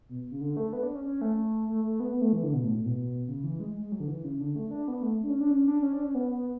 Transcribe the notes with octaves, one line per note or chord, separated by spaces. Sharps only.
B2
C#3
D3
A3
B3
D4
C#4
C#4
A3
A3
A3
B3
B3
A3
E3
D3
B2
A2
A2
B2
C#3
E3
G#3
G#3
G#3
F#3
D3
E3
C#3
D3
A3
D4
B3
A3
D4
C#4
D4
C#4
D4
C#4
D4
C#4
B3
B3